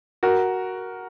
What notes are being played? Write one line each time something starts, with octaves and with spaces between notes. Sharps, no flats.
F#4 A#4